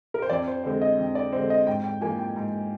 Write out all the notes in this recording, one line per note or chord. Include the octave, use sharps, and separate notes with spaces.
A#4
C5
F2 D5
C5
D3 G#3 C4 C5
D#5
F2
D5
D3 G#3 C4 C5
D#5
G#2 G5
G5
F3 A#3 G#5
G5
G#2